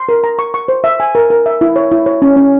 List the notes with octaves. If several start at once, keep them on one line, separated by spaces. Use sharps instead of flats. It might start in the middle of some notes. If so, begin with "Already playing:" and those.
Already playing: C6
A#4
A#5
C#6
C#6
C5
E5
G#5
A#4
A#4
E5
E4
C#5
E4
C#5
C#4
C#4